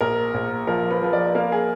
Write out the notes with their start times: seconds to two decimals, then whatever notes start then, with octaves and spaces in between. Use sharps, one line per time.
0.01 A#1 A#4
0.34 A#1
0.67 F3 A#4
0.91 B4
1.02 F3 B4
1.13 D5
1.35 A#3 A#4
1.52 G#4